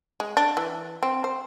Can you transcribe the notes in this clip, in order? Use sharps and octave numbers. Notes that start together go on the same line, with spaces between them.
G#3
D4
E3
C4
C5